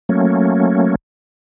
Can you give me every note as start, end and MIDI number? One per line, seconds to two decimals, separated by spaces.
0.09 0.95 54
0.09 0.95 57
0.09 0.95 58
0.09 0.95 61